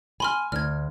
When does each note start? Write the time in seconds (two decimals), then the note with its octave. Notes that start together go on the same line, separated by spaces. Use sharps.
0.20 G#5 B5 C6 F6
0.52 D2 F6 G#6